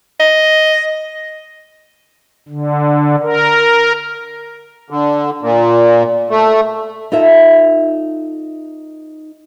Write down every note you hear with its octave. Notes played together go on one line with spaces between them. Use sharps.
D#5
D3
A#4
D3
A#2
A3
D#4 F4 A4 E5